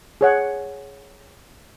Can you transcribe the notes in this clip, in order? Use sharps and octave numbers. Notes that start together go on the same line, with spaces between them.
G#4 C#5 F#5